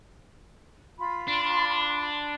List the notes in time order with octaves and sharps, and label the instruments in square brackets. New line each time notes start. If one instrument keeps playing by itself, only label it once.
[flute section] F4 B5
[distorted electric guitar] D4